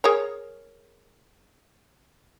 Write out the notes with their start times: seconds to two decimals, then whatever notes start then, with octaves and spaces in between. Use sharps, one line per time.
0.04 G#4 A#4 C#5